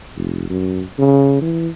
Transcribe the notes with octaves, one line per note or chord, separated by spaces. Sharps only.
F1
F#2
C#3
E3